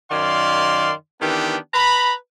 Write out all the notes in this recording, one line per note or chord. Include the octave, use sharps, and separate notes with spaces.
F#2 D#3 D5 F5 C6
D#3 E3 B3 D4 G4
B4 A#5 B5